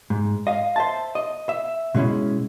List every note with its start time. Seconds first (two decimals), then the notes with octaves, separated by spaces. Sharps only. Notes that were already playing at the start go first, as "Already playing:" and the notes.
0.10 G#2
0.47 D#5 F5
0.76 C5 E5 A5
1.15 D#5
1.49 E5
1.95 B2 G#3 C#4 E4